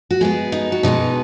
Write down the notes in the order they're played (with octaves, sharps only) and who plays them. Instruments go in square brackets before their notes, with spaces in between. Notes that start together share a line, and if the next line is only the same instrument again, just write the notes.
[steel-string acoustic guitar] F#4
B2 G#3 B3 G#4
D#4
F#4
B2 G#3 B3 D#4